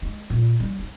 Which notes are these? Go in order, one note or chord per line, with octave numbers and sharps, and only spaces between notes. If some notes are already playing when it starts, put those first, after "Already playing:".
G#3
A#2
G3
C4